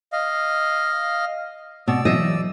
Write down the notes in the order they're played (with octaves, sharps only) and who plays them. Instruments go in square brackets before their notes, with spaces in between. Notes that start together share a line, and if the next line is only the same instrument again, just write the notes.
[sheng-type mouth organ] D#5 F5
[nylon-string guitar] B2 [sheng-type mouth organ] D5 E6
[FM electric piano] E3 F#3 [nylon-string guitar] D#5 E5